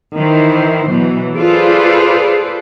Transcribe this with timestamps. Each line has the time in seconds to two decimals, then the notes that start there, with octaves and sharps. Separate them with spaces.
0.17 D#3 E3 E4 C5
0.89 B2 E3 F#3
1.36 F4 G#4 A4 B4 C5 D5